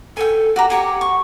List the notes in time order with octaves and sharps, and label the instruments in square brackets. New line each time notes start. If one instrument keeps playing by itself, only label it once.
[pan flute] A4 [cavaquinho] G5 G#5
[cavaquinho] F#4 G4 A#5
[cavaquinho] G4 G#5 [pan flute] F#5
[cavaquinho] C#6